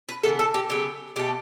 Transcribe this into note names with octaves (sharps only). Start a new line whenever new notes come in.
B4
C#3 E3 B3 A4
A4
G4
C#3 F#3 B3 G4
B2 A3 G4